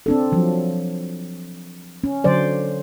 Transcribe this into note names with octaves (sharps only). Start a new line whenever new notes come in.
C4 D4 A4
F3 F#3
C#4
D3 F#3 C5 D5